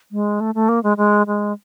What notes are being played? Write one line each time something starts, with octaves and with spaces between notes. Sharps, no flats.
G#3
A3
A3
A#3
G#3
G#3
G#3